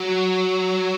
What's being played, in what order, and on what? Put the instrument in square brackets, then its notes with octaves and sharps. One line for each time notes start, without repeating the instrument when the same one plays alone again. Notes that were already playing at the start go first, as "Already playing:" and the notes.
Already playing: [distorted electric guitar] F#3